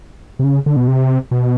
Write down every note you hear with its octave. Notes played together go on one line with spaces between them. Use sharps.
C3
C#3
D3
B2
C3
B2